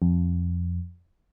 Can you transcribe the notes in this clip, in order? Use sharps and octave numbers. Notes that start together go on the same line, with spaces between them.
F2